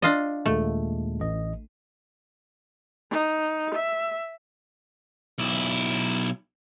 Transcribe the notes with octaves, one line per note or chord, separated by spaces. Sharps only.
D4 F4 D#5
D#2 A#2 G#3 A3
A1 D#5
D#4
E5
B1 E4